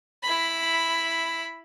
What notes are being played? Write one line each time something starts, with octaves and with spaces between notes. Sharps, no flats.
E4 B5